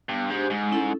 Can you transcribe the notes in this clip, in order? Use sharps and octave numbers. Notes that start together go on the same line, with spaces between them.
G2 B3
G#2 D4 G4 C5
G#2 G#3
C#4 E4 A4